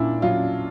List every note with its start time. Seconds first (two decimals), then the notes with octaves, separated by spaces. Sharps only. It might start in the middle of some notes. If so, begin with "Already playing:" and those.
Already playing: A#2 C#4 D4 E4
0.22 F#3 F4